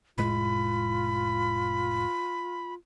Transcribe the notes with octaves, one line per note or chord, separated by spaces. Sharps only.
F1 A2 G#3 F4 B5